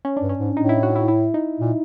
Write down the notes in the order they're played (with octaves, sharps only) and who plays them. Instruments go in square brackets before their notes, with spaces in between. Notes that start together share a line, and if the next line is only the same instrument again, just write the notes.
[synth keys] C#4
[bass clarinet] G2 [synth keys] D4
[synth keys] C#4
[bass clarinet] G#2
[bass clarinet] A2 [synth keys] D#4
[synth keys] E4
F#4
E4
E4
D#4
[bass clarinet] A#2